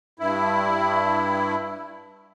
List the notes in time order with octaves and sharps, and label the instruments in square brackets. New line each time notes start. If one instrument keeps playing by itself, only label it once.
[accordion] G2 E4